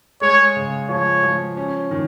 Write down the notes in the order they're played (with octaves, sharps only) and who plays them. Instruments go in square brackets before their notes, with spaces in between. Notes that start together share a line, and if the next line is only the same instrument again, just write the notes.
[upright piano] G#3 [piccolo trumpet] C#5
[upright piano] C#3
[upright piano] F3 [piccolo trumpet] C#5
[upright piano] F3
C#4
D#3